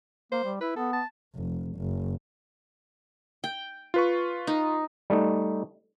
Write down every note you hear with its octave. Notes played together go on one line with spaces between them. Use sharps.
A#3 C5
G3
E4 B4
B3 A4
A5
F1
F#1
G5
F4 B4 C#6
D#4
G3 A3 D#4